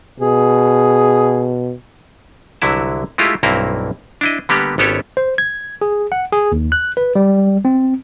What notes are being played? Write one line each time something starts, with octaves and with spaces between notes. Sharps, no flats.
B2 G#4
C2 D3 F#3 E4 A5
G#3 A3 E4 F4 G4
B1 G2 A#3 C4 E4 A#5
D4 E4 D#5
D3 G3 A#3 B3 G4
G#1 B3 C#4 G4 A4 C#5
C5
G#6
G#4
F#5
G#4
D#2
F#6
B4
G3
C4